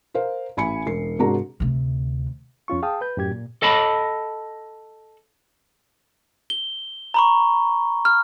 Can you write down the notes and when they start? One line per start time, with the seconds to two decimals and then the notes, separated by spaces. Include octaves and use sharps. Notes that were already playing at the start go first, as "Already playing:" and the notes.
0.14 A#4 C5 F5
0.57 A1 G#5 B5 C#7
0.86 E1 C7
1.19 G#2 C3 D4 F#4 A#4 A#5
1.60 D2 C3
2.68 F2 C#4 F4 C#6
2.82 G#4 F5 G5 A5 D#6
3.01 B4 G6
3.17 F#2 A2 G4 G#6
3.32 A#2
3.62 A4 D#5 A5 B5
6.50 G7
7.14 A#5 B5 C#6
8.05 F6